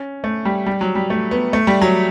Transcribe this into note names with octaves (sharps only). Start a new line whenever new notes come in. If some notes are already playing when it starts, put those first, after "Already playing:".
Already playing: C#4
A3
G3
G3
F#3
G3
A3
B3
A3
G3
F#3